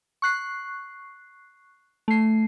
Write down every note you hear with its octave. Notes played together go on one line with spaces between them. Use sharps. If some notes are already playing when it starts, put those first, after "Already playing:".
C#6 F#6 C7
A3 C7